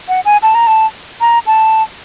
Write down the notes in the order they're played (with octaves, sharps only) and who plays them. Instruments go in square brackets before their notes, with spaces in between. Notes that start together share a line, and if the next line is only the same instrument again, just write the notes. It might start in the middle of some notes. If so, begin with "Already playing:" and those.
[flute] F#5
G#5
A5
A#5
A5
A#5
A5